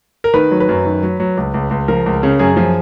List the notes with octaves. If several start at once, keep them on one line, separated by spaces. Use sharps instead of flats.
A#4
D#3 B4
F#3
B4
F#2
D#3
F#3
F#3
C#2
C#2
C#2
F3 A#4
C#2
C#3
F#2 G#4
F3